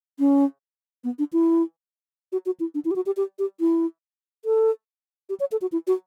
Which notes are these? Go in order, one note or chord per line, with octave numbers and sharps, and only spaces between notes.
C#4
B3
D4
E4
F#4
F#4
E4
D4
E4
G4
F#4
G4
G4
G4
E4
A4
G4
C#5
A4
F#4
E4
F#4